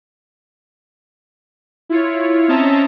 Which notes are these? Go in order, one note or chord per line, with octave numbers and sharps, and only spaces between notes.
E4 F4 C#5
C4 C#4 D#5 E5 A5 A#5